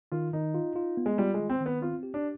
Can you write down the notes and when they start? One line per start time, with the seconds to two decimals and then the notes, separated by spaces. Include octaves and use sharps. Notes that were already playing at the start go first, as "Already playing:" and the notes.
0.12 D#3 F4
0.33 D#3 D#4
0.54 F4
0.76 F4
0.97 B3
1.06 G#3
1.18 G3 F4
1.34 D#3 G#3
1.50 C4
1.61 D#3
1.66 B3
1.81 C4 F4
2.03 G4
2.14 D4